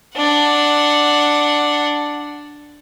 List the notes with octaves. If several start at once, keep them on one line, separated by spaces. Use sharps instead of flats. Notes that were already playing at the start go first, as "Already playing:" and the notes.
D4 F#5